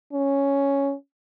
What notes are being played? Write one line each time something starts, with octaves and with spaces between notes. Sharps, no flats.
C#4